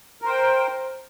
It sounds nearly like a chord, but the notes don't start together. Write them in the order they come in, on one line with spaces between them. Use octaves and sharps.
A#4 C5 G5